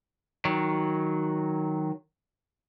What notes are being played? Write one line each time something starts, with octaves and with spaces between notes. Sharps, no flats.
D#3 F#3